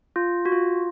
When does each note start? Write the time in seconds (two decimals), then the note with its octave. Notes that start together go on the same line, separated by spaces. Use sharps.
0.16 F4
0.45 F#4
0.52 F4